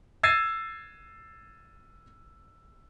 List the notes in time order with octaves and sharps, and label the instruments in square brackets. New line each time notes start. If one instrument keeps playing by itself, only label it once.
[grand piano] E6 G#6 A6 C7 D#7